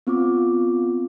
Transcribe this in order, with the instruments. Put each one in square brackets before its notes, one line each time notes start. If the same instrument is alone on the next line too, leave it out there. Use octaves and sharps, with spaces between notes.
[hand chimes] B3 C4 F4 D6